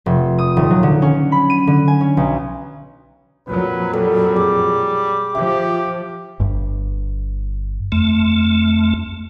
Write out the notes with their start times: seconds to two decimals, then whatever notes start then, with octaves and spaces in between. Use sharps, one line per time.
0.06 F1
0.39 D#6
0.57 D#1
0.71 F#3
0.83 D3
1.02 C#4
1.32 B5
1.50 D#7
1.67 D3
1.88 G#5
2.01 C#4
2.17 B1
3.48 F2 A#2 F#3 B4
3.94 G3 A4
4.36 G#4 D6
5.35 F3 G4 E5
6.40 G1 G2
7.92 F2 A3